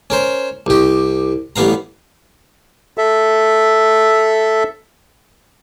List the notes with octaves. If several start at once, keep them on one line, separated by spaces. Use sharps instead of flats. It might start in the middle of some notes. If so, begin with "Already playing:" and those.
C#4 A#4 C5
C2 G4
A1 G2 B3 F5 A#5
A4 E5